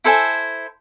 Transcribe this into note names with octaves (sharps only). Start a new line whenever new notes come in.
E4 A4 C5 G#5